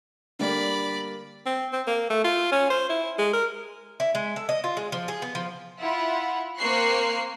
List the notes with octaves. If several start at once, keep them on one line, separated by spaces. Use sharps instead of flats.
D3 G3 A#3 D5 B5
C4
C4
A#3
A3
F4
C#4
C5
E4
G#3
A#4
E4
G#3
A4
D#5
F4
G#3
F3
G#4
B3
F3
E4 F4 F#5
A#3 C4 C5 C#6 F#6 C7